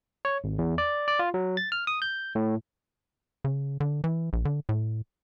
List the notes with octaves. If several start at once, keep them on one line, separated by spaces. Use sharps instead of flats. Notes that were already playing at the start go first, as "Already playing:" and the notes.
C#5
G#1
E2
D5
D5
F4
F#3
A6
F6
D#6
G6
A2
C#3
D3
E3
A#1
D3
A2